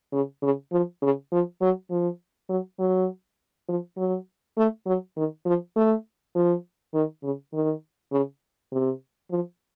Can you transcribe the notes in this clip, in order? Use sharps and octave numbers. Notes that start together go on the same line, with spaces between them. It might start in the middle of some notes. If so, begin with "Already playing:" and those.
C#3
C#3
F3
C#3
F3
F#3
F3
F#3
F#3
F3
F#3
A3
F#3
D#3
F3
A3
F3
D#3
C#3
D#3
C#3
C3
F3